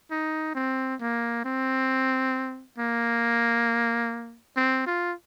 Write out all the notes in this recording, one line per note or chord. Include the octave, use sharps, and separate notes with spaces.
D#4
C4
A#3
C4
A#3
C4
F4